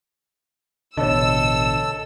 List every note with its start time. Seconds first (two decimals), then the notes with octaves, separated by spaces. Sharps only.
0.97 A1 B2 D3 A4 C#5 D#5 E6